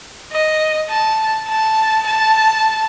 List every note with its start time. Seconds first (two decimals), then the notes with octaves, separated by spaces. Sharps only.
0.32 D#5
0.89 A5
1.47 A5
2.06 A5